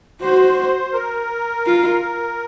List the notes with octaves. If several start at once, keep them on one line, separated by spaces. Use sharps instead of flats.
F#4 C5
A#4
F4